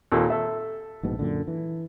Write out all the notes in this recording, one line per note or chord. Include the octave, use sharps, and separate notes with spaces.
D#2 A#2 A4
A4 E5
A#1 G#2 B2
F#2 A#2 D3
E3